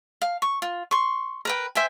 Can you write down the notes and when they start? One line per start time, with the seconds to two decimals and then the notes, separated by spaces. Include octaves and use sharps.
0.22 F5
0.42 C#6
0.62 F4
0.91 C6 C#6
1.45 A#4 B4 G5
1.75 C5 E5 G5 G#5